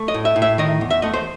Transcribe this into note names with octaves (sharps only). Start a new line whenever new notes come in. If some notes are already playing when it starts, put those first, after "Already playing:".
Already playing: A3
D#5
A2
E5
A2
E5
D#3 D#5
E2
E5
A3 D#5
C5